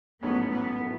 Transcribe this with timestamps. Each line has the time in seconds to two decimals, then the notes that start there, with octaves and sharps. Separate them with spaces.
0.23 A1 G#2 F#3 A3 B3 C#4
0.51 B3
0.80 A2 F#3 B3 E4